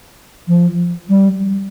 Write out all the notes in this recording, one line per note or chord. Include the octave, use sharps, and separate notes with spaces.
F3
G3